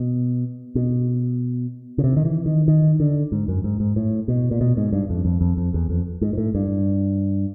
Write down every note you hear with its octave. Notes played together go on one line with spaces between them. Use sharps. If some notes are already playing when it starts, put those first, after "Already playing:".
Already playing: B2
B2
C#3
C3
D#3
E3
D#3
D#3
D3
G#2
F#2
G#2
G#2
A2
B2
A#2
B2
G#2
G2
F2
F2
F2
F2
E2
F2
G#2
G#2
A2
G2